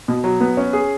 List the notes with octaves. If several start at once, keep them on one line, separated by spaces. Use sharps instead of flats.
B2
F#3
B3
C#4
G#4